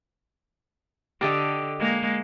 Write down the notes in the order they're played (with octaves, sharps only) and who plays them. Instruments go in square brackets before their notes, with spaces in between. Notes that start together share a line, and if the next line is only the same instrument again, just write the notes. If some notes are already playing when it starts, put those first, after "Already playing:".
[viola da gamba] D3 [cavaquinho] G4 A4 D#5
[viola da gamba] G#3 A#3